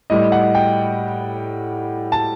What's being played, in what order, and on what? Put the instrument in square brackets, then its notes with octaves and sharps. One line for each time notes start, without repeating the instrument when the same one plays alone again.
[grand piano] A2 G3 D#5
F#5
G5
A5